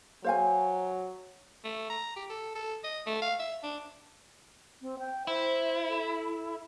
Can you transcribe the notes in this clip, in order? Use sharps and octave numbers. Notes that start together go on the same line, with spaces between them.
F#3 C5 F5 G#5
A3
A#5
G4
A4
A4
D#5
A3
F5
E5
D4
C4
G5
E4 C5
A4